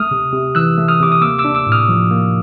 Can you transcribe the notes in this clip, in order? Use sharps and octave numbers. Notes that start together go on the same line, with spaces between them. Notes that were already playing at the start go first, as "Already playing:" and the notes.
Already playing: A3 D#6 F6
C3
C3
E3 E6 F#6
A3
D#6 F6
C3 D6
D#6
A#3 D6 E6
D6 E6
D4
D6 E6
A2
D#6 F6
F3
A#3